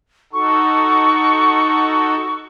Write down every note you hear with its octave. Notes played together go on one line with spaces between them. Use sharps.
D#4 F#4 A4 C#6